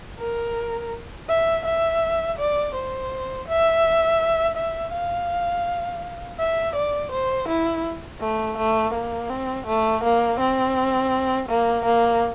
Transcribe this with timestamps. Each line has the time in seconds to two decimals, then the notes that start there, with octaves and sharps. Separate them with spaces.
0.20 A#4
1.29 E5
1.66 E5
2.39 D5
2.75 C5
3.48 E5
4.57 E5
4.93 F5
6.39 E5
6.75 D5
7.12 C5
7.48 E4
8.21 A3
8.57 A3
8.94 A#3
9.30 C4
9.67 A3
10.03 A#3
10.40 C4
11.49 A#3
11.85 A#3